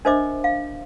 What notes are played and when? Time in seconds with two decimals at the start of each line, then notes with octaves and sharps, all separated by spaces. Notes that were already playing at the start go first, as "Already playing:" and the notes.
0.05 D4 A#4 C5 D#5 E5 D6
0.44 F5